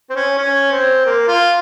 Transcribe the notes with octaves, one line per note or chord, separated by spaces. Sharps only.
C4
C#4
C#4
C4
A#3
F4